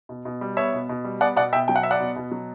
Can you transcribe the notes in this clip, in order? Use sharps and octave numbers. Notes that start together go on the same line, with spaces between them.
B2
B2
G3
B3 C#5 E5
B2
B2
G3
B3 D5 F#5
B2 D5 F#5
B2 E5 G5
F#3 G5
F#5
B3 E5
D5 F#5
B2
B2
F#3